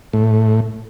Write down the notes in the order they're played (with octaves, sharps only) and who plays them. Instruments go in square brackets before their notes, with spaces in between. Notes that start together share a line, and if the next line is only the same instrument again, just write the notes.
[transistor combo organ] A2